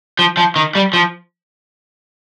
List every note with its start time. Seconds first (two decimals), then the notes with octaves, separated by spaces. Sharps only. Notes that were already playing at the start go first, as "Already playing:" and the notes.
0.19 F3
0.37 F3
0.56 D#3
0.75 G3
0.93 F3